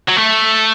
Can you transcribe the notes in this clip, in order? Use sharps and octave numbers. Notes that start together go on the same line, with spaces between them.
F#3
A3